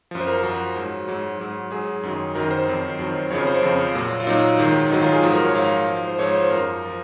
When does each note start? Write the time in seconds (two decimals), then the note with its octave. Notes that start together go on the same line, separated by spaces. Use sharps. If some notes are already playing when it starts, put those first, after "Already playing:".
0.11 F#2 F3
0.21 C5
0.27 A#4
0.43 F#2 F3 F#4
0.76 G#2 F#3
1.08 G#2 F#3
1.40 G#2 F#3
1.71 G#2 F#3 G#4
2.03 F#2 D#3 F#3
2.35 F#2 D#3 F#3 A#4
2.51 C5
2.67 F2 D#3 F#3
2.99 F2 D#3 F#3
3.31 F2 C#3 F3 C#5
3.47 C5
3.63 F2 C#3 F3
3.95 A#2 F#3
4.20 F4
4.27 A#2 F#3 D#4
4.59 G#2 D#3 F#3
4.90 G#2 D#3 F#3 D#4
5.02 F4
5.12 G#4
5.23 G#2 F3 F#4
5.33 A#4
5.45 C#5
5.54 G#2 F3 F5
5.88 G#2 F3
6.08 C5
6.19 G#2 F3 C#5
6.35 C5
6.50 F#2 F3 A#4
6.85 F3